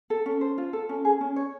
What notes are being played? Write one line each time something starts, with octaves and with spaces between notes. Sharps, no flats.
A4
C#4
C5
F4
A4
C#4
G#4
C#4
C#5